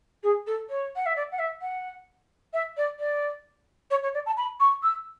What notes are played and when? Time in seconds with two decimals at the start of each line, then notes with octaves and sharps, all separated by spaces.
0.23 G#4
0.46 A4
0.69 C#5
0.96 F#5
1.05 E5
1.16 D5
1.31 F#5
1.38 E5
1.61 F#5
2.53 E5
2.76 D5
2.99 D5
3.90 C#5
4.03 C#5
4.14 D5
4.26 A5
4.37 B5
4.60 C#6
4.82 E6